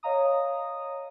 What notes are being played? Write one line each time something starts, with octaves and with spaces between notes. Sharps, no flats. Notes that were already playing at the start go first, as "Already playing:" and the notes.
C#5 D#5 F5 A#5 D#6